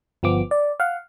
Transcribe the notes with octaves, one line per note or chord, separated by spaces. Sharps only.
G1 F3 B3 D6
D5
F5 F#5